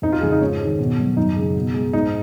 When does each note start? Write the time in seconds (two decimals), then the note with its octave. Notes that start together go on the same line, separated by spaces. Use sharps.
0.02 F2 D#4
0.12 F4
0.21 C#3 F3 G#3 G#4
0.32 D#4
0.41 G#2 C#4
0.61 D#3 G#3
0.79 B2
0.99 F#3
1.17 F#2 D#4
1.36 C#3 G#3
1.55 B2
1.74 G#3
1.93 G#2 D#4